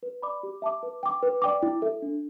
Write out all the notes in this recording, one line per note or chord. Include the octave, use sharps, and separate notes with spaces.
B4
D5 B5 D6
G4
E5 A5 D6
B4
G5 D6
B4
D5 G5 D6
E4
A4 E5
D4